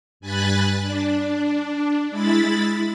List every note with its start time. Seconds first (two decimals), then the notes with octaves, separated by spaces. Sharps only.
0.20 G2 G#5 B5 F#6 A6
0.80 D4
2.10 G#3 E4 B5 A6